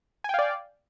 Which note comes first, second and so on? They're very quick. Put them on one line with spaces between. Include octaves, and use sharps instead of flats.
G#5 G5 F5 D5